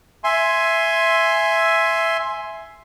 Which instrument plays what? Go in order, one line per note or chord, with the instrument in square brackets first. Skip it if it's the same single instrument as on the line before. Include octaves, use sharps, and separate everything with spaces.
[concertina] E5 G#5 C6